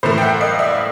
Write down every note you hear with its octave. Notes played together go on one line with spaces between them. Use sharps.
A2 E3 A3 A#4 C5
G5
E5 F#5
D#5 F5
D5 E5